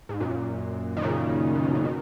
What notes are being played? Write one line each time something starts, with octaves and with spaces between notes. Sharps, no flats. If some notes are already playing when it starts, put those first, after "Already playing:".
G#2
F#2 A#2
D#3
A#2 C#3
A#2
B2
C#3
B2 D#3